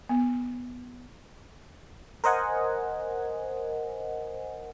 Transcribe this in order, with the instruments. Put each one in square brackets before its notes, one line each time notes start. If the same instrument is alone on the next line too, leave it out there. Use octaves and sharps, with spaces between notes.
[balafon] B3
[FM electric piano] A#4 C5 D#5 F#5 G#5